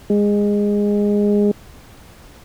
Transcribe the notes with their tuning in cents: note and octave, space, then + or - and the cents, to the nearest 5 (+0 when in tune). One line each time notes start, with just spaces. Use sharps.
G#3 -15